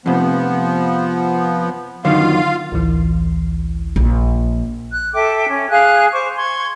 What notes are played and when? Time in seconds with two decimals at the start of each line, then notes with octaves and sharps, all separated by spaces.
0.06 F2 C3 F3 B3
2.04 F#2 D3 D#3 F4 F5
2.72 A1 D2 E3
3.96 A#1
4.92 F#6
5.14 A4 E5 G5 D6
5.49 C#4
5.71 G#4 F5 F#6
6.12 C5 C#6 D6
6.37 C6 C#6 G#6